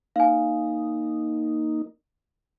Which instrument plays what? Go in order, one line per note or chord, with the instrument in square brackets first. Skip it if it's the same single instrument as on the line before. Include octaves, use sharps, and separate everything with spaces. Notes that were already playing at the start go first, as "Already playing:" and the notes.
[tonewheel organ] A#3 D#4 [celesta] F5 G#5